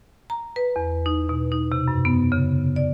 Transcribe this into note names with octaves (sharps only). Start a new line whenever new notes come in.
A#5
B4
E2
D#4
B2
D#4
C3
F#2
B3
C#3
D5